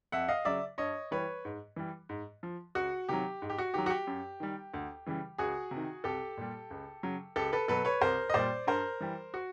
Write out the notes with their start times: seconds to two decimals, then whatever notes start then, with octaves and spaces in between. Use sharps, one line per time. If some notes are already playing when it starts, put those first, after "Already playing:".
0.12 F2 E5 F#5
0.28 D#5 F5
0.45 C#3 F#3 D5 E5
0.78 G2 C#5 D#5
1.11 E3 G3 B4 C#5
1.45 G#2
1.76 E3 G3
2.09 G#2
2.43 F3
2.75 C#2 F#4
3.09 C3 D#3 F#3 G4
3.42 G#2
3.49 G4
3.58 F#4
3.74 D#3 F#3 G4
3.86 F#4
3.90 G4
4.07 F#2
4.40 D#3 G3
4.74 D2
5.06 C#3 E3 G3
5.38 C#2 F#4 G#4
5.71 C3
5.76 D#3
6.04 C2 G4 A4
6.37 A#2 G3
6.71 C#2
7.03 C#3 F#3
7.36 C#2 G4 A4
7.52 A4 B4
7.68 B2 F#3 A4 B4
7.85 B4 C#5
8.01 C2 A#4 C5
8.29 D#5
8.34 A#2 G3 C5 D5
8.67 G2 A#4 C5
9.01 E3 G3
9.34 F#4